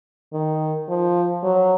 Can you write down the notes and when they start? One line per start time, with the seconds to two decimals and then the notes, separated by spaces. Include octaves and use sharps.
0.33 D#3
0.89 F3
1.44 F#3